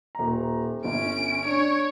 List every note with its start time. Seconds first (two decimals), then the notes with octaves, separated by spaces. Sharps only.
0.15 D#1 A#5
0.84 G1 C#4 D7
1.45 D4 C#5